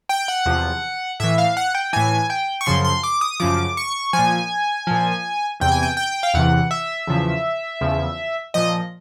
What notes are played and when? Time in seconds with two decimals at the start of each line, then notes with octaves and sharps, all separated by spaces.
0.09 G5
0.28 F#5
0.46 E2 C3 F3
1.20 A2 E3 E5
1.38 F5
1.57 F#5
1.75 G5
1.93 A2 E3 G#5
2.30 G5
2.61 C#6
2.66 F#2 C#3 F3 C6
2.85 C6
3.03 D6
3.21 D#6
3.40 F#2 C#3 F3 D6
3.77 C#6
4.13 F3 G#5
4.19 A#2
4.87 A#2 F3
5.60 E2 C3 E3 G5
5.72 G#5
5.83 G5
5.97 G5
6.23 F5
6.34 E2 C3 E3 F#5
6.71 E5
7.07 E2 C#3 F3
7.81 E2 C#3 F3
8.54 A#2 F3 D#5